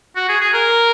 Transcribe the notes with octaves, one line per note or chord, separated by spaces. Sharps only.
F#4
G#4
G#4
A#4